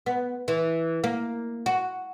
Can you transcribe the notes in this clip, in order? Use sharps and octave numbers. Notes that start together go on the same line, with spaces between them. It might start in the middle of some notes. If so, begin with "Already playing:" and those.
B3
E3
A#3
F#4